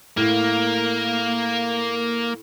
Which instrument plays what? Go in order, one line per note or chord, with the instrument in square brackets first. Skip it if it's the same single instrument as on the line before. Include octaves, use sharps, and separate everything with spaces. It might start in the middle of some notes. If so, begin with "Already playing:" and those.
[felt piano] A2 [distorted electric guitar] A#3